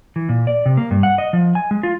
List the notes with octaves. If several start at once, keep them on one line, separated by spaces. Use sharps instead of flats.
E3
A#2
D5
C3
A#3
G2
F#5
D#5
F3
G#5
G#3
F4